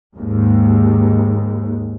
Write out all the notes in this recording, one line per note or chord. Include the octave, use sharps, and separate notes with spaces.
D#2 G#2